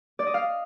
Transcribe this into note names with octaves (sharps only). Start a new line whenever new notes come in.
D5
D#5
F5